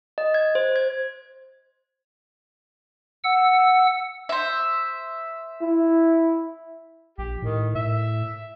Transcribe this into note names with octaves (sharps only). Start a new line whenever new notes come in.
D#5
G#6
C5
G#6
F#5 E6
C5 E5
E4
A#1 G4
A2 D#3
A2 E5